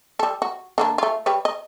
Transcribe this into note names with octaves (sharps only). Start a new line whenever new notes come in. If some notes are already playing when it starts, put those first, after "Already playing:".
G3 A4
F#4
D3 A#3 D4
A3 F4
G3 B4 C#5
D#5